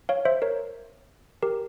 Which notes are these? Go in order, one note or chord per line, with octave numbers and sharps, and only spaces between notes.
C#5 F5
C5 E5
A#4 C#5
G4 A#4